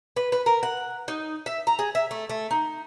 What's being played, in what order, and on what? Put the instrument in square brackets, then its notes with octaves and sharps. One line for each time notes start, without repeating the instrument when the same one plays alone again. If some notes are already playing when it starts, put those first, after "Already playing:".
[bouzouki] B4
B4
A#4
F#5
D#4
E5
A#5
G#4
E5
A3
A3
D#4